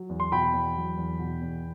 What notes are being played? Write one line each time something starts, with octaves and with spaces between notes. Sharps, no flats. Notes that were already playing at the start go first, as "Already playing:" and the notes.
Already playing: F#3
E2
C6
B2 G5 B5
E2
F#3
E2
B2
E2